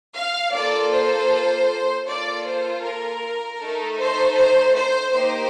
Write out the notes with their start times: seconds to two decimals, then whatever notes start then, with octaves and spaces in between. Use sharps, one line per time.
0.14 F5
0.52 A#3 F4 A4 D5
0.92 C5
2.05 A#3 F4 A4 D5
2.45 C5
2.83 A#4
3.59 A3 D#4 A4
3.98 C5
4.36 C5
4.75 C5
5.12 A#3 D#4 G4 C5